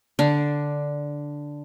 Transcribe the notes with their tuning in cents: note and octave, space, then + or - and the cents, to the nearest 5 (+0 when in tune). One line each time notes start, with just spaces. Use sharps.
D3 -5 D4 +0